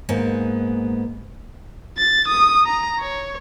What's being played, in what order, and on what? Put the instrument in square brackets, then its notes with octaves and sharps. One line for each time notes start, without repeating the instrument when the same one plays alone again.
[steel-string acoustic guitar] G#2 A#3 B3 D#4
[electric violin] A6
D#6
A#5
C#5